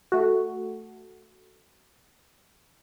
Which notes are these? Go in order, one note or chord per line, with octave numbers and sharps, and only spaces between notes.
A3 F#4